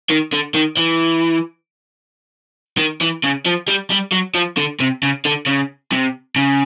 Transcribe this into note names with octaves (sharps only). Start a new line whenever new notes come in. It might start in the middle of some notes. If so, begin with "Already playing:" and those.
D#3
D3
D#3
E3
D#3
E3
C#3
F3
G3
G3
F#3
F3
D3
C3
C#3
D3
C#3
C3
C#3